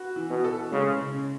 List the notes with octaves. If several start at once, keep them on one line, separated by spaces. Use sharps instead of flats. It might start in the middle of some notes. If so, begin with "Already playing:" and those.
Already playing: F#4 B4
E3
B2
A4
C#3 G#3
C#3